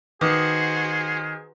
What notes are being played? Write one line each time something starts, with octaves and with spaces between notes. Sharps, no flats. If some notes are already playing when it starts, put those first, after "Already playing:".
D#3 F#4 G#4 B4 C5 D6 D#6